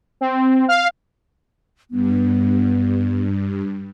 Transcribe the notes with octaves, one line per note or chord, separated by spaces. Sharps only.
C4
F5
G2 B3